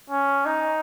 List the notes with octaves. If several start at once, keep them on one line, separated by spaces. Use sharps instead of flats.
C#4
D#4